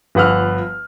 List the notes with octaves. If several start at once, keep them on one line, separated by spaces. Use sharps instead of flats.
G1 F3 B4 F#5 E6 F6